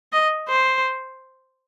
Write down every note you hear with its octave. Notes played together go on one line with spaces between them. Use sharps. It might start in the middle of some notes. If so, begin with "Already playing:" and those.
D#5
C5